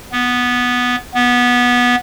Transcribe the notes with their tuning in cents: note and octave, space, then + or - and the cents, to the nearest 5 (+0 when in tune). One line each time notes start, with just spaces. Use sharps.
B3 -5
B3 -15